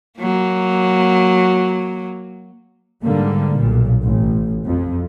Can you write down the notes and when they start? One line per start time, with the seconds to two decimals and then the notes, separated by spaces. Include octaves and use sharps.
0.19 F#3 A#3
3.02 G#2 D3 G3 A#3
3.59 B1 A#2
4.04 A1
4.65 F2